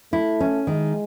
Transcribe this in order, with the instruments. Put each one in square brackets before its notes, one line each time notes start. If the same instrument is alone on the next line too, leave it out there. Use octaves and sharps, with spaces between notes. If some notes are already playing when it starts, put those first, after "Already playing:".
[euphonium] A3 [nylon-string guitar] E4
[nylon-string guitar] C#4
[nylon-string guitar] D#3 [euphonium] G#3